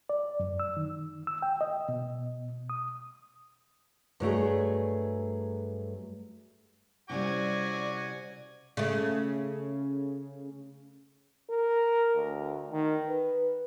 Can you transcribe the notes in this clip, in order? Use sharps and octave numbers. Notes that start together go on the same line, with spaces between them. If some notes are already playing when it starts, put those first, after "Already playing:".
D5
F#2
E6
D#3
E6
G5
D#5
B2
D#6
G2 F#3 A3 G#4
C3 G3 C#4 E4 F#4 D5 G#5 D6
C#3 A3
A#4
D2
D#3
B4